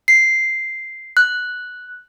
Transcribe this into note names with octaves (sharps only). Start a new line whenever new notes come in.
C7
F#6